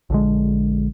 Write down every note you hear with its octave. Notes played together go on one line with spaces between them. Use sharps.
A#1 D3 G#3